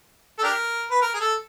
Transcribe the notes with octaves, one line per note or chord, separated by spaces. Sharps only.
A4
D4 G4 A#4
B4
A#4
G#4
A4